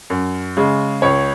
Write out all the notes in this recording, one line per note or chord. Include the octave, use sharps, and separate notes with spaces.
F#2
C#3 G#3
C#2 C#5